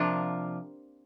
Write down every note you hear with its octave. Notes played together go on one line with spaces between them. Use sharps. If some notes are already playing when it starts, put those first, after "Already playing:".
Already playing: C3 F3 A#3 D4 F4